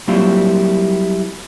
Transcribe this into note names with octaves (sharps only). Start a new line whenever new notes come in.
F#3 G3 A#3 C4 E4 F4